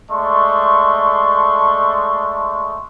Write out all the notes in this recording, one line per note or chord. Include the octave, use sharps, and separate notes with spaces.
G#3 A3 D5 C6 C#6